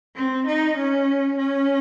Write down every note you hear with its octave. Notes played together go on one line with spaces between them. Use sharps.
C4
D#4
C#4
C#4